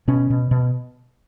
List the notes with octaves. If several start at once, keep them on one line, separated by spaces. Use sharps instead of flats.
B2 C#4
B2
B2